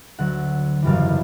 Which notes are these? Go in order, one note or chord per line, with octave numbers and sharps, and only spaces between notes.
D2 D3 F#3 F#5
G#1 F#2 C#3 E3 G3 F5